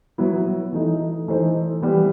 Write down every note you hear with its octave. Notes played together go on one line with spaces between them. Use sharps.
F#3 B3 E4
E3 A3 D#4
E3 A3 D#4 A4 C5
E3 G3 B3